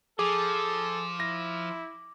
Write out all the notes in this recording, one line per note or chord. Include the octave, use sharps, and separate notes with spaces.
F3 G#4 A4 D6
E4 A#6